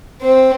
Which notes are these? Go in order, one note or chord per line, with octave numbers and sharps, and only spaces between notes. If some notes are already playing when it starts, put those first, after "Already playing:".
C4